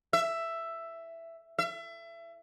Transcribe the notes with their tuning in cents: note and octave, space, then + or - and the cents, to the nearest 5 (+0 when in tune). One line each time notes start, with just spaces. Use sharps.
E5 +10
E5 +30